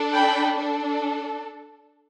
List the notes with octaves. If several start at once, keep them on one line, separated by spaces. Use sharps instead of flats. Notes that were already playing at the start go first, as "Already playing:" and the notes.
Already playing: D4 A4
G5 B5
D4 A4